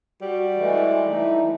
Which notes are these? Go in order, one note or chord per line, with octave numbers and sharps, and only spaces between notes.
G3 F#4
E3 G#3 A3
E3 A3 D#4 E4